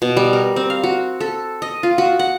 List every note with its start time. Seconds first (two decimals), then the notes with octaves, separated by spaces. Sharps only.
0.02 B2
0.17 G3
0.33 A#4
0.56 C4
0.70 F5
0.83 F#4
1.21 A4
1.62 D#5
1.83 F4
1.98 F#4
2.19 F#5